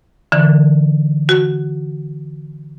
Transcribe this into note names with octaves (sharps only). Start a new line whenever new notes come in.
D3 E3
F#4